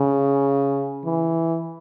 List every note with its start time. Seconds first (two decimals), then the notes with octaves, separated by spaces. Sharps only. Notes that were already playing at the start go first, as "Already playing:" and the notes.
Already playing: C#3
1.05 E3